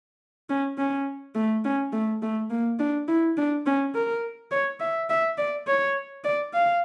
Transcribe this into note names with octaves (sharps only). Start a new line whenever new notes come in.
C#4
C#4
A3
C#4
A3
A3
A#3
D4
E4
D4
C#4
A#4
C#5
E5
E5
D5
C#5
D5
F5